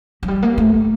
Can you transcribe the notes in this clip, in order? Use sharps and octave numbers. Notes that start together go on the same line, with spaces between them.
F#3
G3
A#3
A3